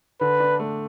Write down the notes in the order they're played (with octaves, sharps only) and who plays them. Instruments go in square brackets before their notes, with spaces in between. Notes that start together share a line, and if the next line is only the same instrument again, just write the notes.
[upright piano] D3 [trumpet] B4
[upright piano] D4
A3